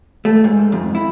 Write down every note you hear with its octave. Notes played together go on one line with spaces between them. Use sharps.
A3
G#2
F2
E4